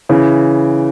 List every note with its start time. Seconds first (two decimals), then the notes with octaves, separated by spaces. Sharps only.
0.09 C#3 E3